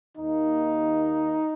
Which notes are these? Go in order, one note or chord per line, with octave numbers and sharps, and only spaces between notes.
D#2 D#3 A#3 D#4